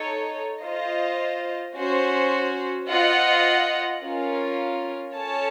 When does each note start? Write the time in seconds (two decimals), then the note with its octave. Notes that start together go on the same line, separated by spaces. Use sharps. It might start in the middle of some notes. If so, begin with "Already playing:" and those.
Already playing: D#4 A4 C#5
0.62 F4 C5 D#5
1.76 C#4 F#4 C5
2.88 F4 C5 D#5 F#5
4.02 C#4 F4 A#4
5.15 C#4 A4 C#5 A5